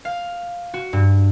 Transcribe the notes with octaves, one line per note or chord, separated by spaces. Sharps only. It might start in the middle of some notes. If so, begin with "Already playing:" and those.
F5
F#4
G2